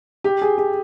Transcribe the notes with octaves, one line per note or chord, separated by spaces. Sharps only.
G4
G#4
G4